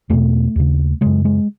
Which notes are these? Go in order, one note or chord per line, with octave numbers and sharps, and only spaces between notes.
E2 B2 A3
D#2 C#3
F#2 C#3 G#3
G#3